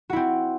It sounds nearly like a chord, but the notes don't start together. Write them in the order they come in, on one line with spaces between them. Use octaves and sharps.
F#4 E4 C4